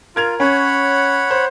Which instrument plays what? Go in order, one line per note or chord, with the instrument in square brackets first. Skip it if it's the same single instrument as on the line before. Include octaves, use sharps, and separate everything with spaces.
[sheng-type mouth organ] F4 [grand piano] A#4 G#6 F7
[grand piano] C#4 [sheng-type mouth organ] C#5 F#5 B5
[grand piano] C5